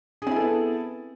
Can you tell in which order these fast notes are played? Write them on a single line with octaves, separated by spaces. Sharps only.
G#4 C4 E4 A4 B3